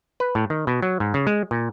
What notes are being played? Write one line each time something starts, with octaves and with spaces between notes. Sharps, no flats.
B4
A2
D#3
B2
F#3
G#2
C#3
G#3
A#2